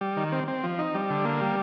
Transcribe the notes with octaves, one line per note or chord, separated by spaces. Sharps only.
G3
D#3
C4
C4
F3
D#4
G3
D3
A#3
G3